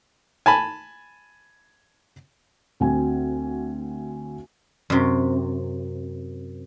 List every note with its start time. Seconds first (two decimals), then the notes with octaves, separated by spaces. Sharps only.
0.46 G#5 A5 B5
2.80 D2 C4 F#4 G#5
4.90 F#2 C3